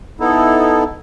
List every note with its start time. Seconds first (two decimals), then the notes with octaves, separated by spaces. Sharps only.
0.20 B3 D#4 E4 A4